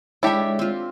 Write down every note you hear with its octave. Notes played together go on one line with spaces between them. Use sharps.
G#3 D4 E4 G4 A4 C#5 E5
C4 F4